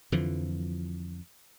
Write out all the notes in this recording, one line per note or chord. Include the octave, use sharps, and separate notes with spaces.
F2 D3 E3 F3